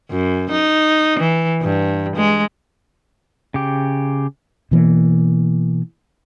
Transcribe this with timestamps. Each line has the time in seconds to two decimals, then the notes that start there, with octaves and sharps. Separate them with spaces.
0.11 F#2
0.51 D#4
1.20 E3
1.62 G2
2.16 G#3
3.54 C#3 G4
4.71 B2 E3 A#3